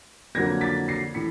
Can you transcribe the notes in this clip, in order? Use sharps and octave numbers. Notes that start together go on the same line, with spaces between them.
F2 D3 F#3 A#3 G#6 A#6
A6 B6
A#6 C7
A2 E3 B6 C#7